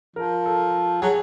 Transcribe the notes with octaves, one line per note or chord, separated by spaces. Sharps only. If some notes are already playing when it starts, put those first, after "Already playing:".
F3 A#4
A4
F#3 G#4